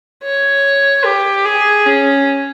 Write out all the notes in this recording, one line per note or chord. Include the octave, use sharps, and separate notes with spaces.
C#5
G4
G#4
C#4